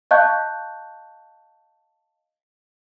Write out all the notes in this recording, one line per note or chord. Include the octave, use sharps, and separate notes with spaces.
D#5 F5 A5 C#6 F#6 G6